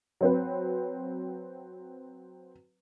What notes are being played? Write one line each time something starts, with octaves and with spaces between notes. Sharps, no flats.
F#3 C4 B4